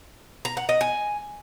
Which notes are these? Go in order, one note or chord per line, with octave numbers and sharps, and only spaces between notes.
A#5
F#5
D#5
G#5